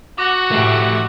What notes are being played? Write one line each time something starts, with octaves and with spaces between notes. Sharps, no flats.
F#4 F#5 D6 A#6
A2 A3 G4